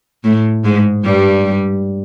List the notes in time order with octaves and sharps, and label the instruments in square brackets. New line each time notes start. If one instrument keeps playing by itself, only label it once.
[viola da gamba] A2 A3
G#2 G#3
G2 G3